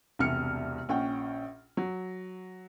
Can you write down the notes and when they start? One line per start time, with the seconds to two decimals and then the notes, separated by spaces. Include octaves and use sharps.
0.19 E1 C2 C3 F6 C#7
0.89 A#1 C#4 F#5 G5
1.77 F#3